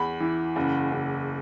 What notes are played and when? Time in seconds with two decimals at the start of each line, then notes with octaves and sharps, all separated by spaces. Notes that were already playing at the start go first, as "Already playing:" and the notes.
Already playing: E2 B5
0.20 E3
0.56 F#1
0.92 F#1